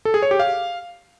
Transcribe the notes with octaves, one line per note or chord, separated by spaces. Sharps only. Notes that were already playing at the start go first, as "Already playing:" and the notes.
A4
G#4
C#5
G4
F5